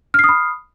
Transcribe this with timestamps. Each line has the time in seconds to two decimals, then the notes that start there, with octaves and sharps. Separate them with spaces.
0.14 F6
0.19 C7
0.24 D#6
0.29 B5